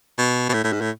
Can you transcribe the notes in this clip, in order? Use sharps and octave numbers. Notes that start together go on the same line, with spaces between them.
B2
B2
A2
A2
G#2
A2